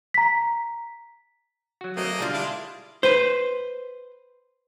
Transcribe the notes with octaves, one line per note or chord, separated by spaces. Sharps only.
A#5 B6
F#3 F#4
F#3 A3 A#3 C4 D#5
D3 G3 D4 F4 G#4
G#3 D4 E4 D5
B4 C5